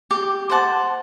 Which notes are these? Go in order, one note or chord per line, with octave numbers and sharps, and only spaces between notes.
G4
C5 F#5 A5